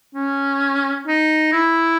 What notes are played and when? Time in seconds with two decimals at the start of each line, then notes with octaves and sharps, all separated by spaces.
0.15 C#4
1.07 D#4
1.52 E4